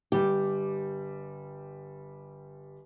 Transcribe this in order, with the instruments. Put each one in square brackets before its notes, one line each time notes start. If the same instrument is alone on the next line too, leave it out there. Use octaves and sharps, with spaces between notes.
[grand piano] G1 G3 [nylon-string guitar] G4